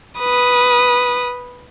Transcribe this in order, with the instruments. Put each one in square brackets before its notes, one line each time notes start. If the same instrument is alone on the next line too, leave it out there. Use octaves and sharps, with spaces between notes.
[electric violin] B4 D#6